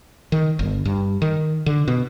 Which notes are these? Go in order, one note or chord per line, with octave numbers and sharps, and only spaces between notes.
D#3
G1
G2
D#3
D3
B2